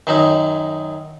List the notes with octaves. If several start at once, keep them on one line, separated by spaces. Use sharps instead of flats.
F#2 D#3 F#3 D#4